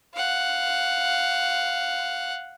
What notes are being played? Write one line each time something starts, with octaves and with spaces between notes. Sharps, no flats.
F5 F#5